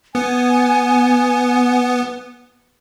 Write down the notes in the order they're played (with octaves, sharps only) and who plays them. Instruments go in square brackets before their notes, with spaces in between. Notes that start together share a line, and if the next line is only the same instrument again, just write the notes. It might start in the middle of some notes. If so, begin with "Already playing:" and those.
[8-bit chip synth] B3 [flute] G#5